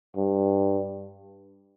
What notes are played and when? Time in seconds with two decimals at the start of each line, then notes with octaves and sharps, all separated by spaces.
0.16 G2